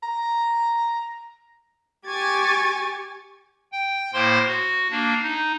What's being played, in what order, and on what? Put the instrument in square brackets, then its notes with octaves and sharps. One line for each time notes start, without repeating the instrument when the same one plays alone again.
[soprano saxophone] A#5
[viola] G4 C#6 [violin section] G#5 G#6 A6
[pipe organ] G5
A2 A#3 C5 C6
F#4
A#3 D4
D#4